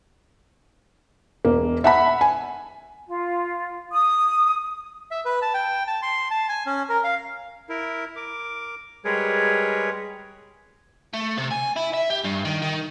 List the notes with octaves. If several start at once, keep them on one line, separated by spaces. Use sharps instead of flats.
E1 A#3
E5 F#5 B5
G#5
F4
D#6
E5
B4
A5
G5
A5
C6
A5
G#5
C#4
A#4
F5
E4 A#4
A#4 D6
G3 G#3 G#4 A#4 B4 C#5
A3
C3
G#5
E4
E5
G4
G2
D#3
D#3